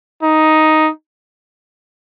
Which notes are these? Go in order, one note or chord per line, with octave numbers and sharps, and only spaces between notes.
D#4